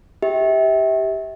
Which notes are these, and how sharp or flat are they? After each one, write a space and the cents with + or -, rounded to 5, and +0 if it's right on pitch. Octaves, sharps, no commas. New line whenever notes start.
G4 +0 E5 -30